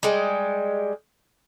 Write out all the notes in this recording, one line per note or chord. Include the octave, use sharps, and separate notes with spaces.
G3 G#3